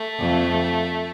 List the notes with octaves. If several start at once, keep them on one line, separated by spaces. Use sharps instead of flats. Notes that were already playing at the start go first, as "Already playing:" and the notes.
Already playing: A3
F2